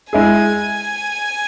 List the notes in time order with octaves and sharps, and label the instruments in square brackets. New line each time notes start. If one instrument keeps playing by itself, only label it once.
[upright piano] G#3 E4 G#4 [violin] G#5